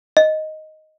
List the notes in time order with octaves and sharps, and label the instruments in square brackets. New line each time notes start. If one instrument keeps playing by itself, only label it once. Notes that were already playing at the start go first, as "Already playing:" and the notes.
[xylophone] D#5